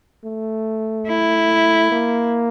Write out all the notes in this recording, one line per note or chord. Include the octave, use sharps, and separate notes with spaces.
A3
E4
A#3